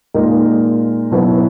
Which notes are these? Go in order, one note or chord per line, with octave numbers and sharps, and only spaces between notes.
A#2 G#3 D#4 A#4
B2 F#3 B3 E4 B4